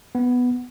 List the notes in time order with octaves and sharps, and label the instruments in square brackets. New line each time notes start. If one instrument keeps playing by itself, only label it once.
[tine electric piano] B3